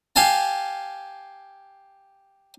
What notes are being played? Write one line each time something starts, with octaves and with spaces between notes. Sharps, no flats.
G4 F5 G#5 A5